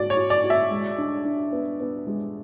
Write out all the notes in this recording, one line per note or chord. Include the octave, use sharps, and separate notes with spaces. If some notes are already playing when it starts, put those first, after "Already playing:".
Already playing: G#2 G#3 F#4 D5
C#5
F#4
D5
F#4
E5
G#3
D4
D4
B3
B3
G#3